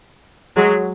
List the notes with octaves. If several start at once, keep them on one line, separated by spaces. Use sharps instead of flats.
F#3 G#3